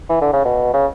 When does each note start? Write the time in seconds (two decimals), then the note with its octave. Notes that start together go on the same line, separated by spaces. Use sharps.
0.09 E3
0.21 D3
0.33 C#3
0.45 B2
0.74 C#3